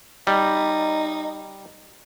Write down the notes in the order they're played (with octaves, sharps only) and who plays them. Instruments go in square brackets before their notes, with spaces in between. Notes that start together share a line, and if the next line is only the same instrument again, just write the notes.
[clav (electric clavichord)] G3 [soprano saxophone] D#4